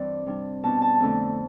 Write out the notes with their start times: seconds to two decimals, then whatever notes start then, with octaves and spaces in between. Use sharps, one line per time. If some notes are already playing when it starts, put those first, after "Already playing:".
Already playing: G2 E3 G3 C4 D5
0.27 C3 G3 D4
0.64 B2 B3 D4 A5
0.82 A5
1.00 F2 D3 A3 D4